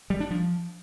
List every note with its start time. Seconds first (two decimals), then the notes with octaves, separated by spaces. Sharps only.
0.10 G3
0.20 D4
0.31 F3